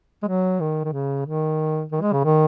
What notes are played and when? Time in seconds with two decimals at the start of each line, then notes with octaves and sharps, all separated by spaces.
0.23 G#3
0.27 F#3
0.60 D#3
0.84 D#3
0.92 C#3
1.26 D#3
1.92 D#3
2.01 G#3
2.13 C#3
2.24 D#3